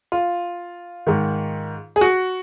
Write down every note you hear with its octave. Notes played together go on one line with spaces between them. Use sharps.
F4
G#2 D#3
G#4
F#4